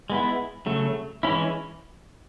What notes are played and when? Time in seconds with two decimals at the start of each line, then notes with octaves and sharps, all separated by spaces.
0.10 G#3 B3 E4
0.66 C#3 F#3 A3
1.23 E3 G#3 C#4 E4